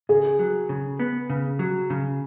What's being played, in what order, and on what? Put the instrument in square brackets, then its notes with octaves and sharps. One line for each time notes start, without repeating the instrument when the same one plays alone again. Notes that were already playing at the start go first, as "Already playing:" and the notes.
[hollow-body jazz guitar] C#3 [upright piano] G#4
[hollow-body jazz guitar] F#3
C#3
B3
C#3
F#3
C#3